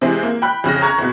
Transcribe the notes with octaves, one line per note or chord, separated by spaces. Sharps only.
C3 E3 G#3 C4 G#4
A#3
G5 B5 F#6
F2 C#3 F#6 A#6
A#5 C#6 F#6 G#6
F#1 B2